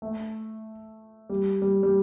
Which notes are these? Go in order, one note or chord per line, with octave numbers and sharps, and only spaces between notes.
A3
G3
G3
G3